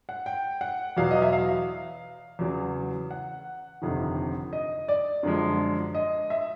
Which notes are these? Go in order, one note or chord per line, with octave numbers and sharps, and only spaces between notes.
F#5
G5
F#5
E2 B2 F#3 F5
D#5
E5
F5
E2 C#3 F#3
F#5
G1 F2 C3 D#3
D#5
D5
F#2 D3 F3 G#3
D#5
E5